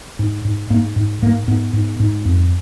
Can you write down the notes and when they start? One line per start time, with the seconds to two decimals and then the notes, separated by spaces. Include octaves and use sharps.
0.19 G#2
0.45 G#2
0.70 G#2 A#3
0.96 G#2
1.22 G#2 A#3
1.48 G#2 B3
1.73 G#2
2.00 G#2
2.25 F2